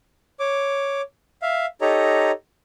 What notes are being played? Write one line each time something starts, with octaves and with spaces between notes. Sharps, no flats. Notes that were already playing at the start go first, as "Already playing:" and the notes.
C#5 D6
E5 F5
D#4 G4 A4 C#5 D#5 A#5